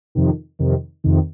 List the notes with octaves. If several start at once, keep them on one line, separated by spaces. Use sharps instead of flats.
F2 C3 D#3
F2 C3 D#3
F2 C3 D#3